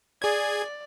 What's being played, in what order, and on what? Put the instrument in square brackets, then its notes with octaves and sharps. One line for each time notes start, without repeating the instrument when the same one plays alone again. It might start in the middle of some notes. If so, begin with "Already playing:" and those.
[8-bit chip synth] G#4 G#6 [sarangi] D5